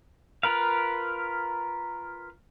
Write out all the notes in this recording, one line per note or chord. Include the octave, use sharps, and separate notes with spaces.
F4 A#4 B4 F5